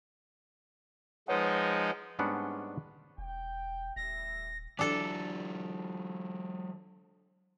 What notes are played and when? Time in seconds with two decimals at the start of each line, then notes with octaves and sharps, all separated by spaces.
1.28 F3 G#3 D#4 B4 C#5 F#5
2.19 G#2 G3 B3 C#4 D4 F#5
3.18 E1 G5
3.96 D#1 A1 G3 E5 A#6
4.79 E3 F#3 D4 A4 A5